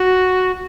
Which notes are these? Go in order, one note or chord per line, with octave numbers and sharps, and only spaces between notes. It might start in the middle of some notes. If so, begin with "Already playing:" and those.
Already playing: F#4